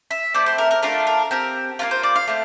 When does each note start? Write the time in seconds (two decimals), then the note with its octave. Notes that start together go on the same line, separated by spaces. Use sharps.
0.11 E5
0.34 A3 C4 E4 D5
0.46 C5
0.58 A#4
0.71 A#4
0.82 A3 D4 F4 A4 A#4
1.07 A#4
1.31 C4 G4 A#4
1.79 A#3 D4 F4 A#4
1.91 C5
2.03 D5
2.16 F5
2.28 A3 C4